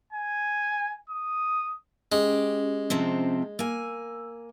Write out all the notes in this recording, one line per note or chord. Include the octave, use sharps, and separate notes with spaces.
G#5
D#6
G#3 C#4 G4
C3 F3 C4
A#3 G#5 E6